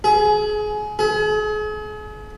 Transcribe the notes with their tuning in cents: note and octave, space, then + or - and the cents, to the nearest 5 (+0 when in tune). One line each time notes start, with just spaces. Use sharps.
G#4 +25
G#4 +40